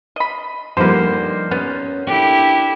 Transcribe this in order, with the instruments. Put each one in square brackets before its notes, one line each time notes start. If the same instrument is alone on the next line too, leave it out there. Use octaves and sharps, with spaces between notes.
[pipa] D#5 B5
[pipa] D3 B4 [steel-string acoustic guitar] F3 G3 D#4 [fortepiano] A#3 C5
[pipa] B3 [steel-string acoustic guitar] C#4
[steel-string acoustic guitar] D4 A4 [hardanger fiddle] E4 G4